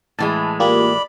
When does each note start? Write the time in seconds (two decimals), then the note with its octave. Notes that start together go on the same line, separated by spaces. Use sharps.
0.19 A2 E3 G#3 A5
0.60 A#3 F4 G4 D5 B5